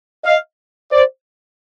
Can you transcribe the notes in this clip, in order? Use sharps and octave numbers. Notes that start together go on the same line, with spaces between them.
D#5 F5
C5 D5